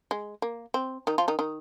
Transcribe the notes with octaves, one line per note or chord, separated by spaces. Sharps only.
G#3
A#3
C4
D#3 D#4
F3 F4
D#3 D#4
D#3 D#4